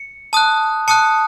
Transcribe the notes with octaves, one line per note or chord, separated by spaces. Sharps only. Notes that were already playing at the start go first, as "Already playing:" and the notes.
Already playing: C#7
A5 D#6 F#6
A5 D#6 F#6 C#7